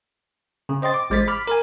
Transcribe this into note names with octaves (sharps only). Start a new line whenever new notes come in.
C#3
C5 D#5 G5 C6 A6
D6
A1 G#3 C5 A6 B6
B5 D6 F6 B6
A#4 G#5